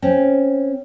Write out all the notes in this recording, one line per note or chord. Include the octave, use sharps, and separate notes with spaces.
C4 C#4